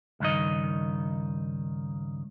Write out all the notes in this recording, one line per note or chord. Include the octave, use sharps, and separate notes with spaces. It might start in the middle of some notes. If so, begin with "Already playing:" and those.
C#2 G2 D#3 D#5